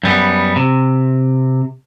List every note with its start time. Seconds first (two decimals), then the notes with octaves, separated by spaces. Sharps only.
0.03 F#2 G3 B3
0.56 C3